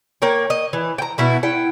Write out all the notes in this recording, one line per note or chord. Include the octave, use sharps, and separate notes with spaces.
A#3 C#5 G5
D#5
E3
G5 A#5
B2 E4 F#4
E4 F#5 G5